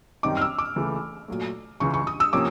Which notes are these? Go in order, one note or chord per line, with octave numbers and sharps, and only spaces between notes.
F#2 D#3 G3 C4 D#4 D6
F6
E6
D6
C#2 C#3 E3 A3
A#2 F#3 A3
C#2 C#3 E3 C#6
C#6
D#6
E6
C3 F3 A#3 C#4 D6